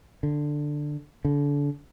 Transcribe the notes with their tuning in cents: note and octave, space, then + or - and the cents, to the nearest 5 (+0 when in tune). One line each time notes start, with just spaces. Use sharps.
D3 +10
D3 -30